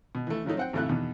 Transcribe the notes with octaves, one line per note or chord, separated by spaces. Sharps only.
B2
E3 A3
C#3 F3 F#3 A3 D#4
C4 F#5 G5
G#1 F2 C3 A3 E4 F#6
E2 B2 D#3